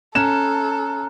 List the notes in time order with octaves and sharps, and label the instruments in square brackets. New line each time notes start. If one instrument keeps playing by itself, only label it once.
[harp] C#4 [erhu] A4 [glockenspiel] A#5 F6 F#6 [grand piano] E7